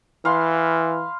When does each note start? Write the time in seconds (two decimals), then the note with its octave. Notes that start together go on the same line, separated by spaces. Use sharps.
0.25 E3 F5 B5 C6